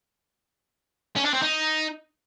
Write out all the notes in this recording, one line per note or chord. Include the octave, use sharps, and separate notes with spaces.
C#4
D4
C4
D#4